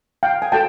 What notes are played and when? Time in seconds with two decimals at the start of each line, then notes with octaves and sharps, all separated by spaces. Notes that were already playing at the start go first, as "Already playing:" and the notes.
0.23 F5 G5
0.42 G#5
0.52 F#4 A4 C#5 G5 A5